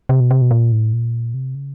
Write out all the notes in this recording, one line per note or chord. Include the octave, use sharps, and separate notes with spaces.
C3
B2
C3
B2
A#2
A2
A#2
C3
C#3